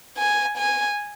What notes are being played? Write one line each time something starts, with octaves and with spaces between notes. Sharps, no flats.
G#5
G#5